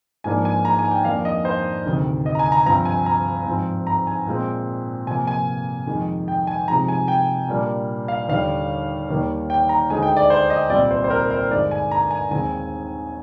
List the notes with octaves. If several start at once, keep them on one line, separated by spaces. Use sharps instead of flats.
G#2 F3 A#3 D4 G#5
G#5
A#5
G#5
G5
F2 D#3 A#3 D4 F5
D#5
C5
D2 C3 D#3
D#5
A#5
G#5
A#5
G2 F3 C4 A#5
G#5
A#5
G#2 F3 C4
A#5
G#5
A#2 G#3 C4
C3 F3 A#3 G#5
G#5
F2 D#3 G#3 D#4
G5
G#5
C3 F3 G#3 D#4 A#5
G#5
G5
A#2 G3 A#3 D4
F5
D#2 D3 G3 F5
D#2 D#3 G3 A#3
G5
A#5
D2 D3 G#3 D#4 G#5
G5
D5
C5
D#5
C2 A#2 G3 C4 D5
C5
C5
A#4
C5
G2 D3 G#3 D#4 D5
G#5
A#5
G#5
D#2 D#3 G#3 C4 D#4 G#5